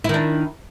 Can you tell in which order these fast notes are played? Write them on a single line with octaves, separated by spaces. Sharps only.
E4 D#3 D4